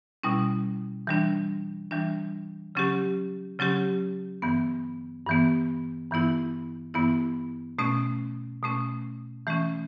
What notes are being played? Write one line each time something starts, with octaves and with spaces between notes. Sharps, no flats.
B2 G3 C#4 E4
E3 G3 D4
E3 G3 D4
C#3 F#3 C#4 G4
C#3 F#3 C#4 G4
G2 E3 B3
G2 E3 B3
G2 E3 B3 E4
G2 E3 B3 E4
B2 A3 C#4
B2 A3 C#4
E3 A3 C#4